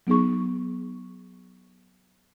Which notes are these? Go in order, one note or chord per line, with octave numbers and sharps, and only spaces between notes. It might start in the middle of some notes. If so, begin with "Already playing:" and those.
F#3 B3 D#4 G#4 C#6